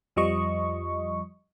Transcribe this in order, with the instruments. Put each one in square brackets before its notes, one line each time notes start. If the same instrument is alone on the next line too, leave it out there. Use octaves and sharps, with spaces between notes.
[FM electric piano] F2 F3 G3 D#5 C#6